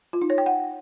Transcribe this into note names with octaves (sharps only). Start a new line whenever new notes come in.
F4
D#4
C#5
G5
F#5